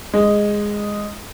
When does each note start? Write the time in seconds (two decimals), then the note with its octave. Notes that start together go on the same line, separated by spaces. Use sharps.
0.14 G#3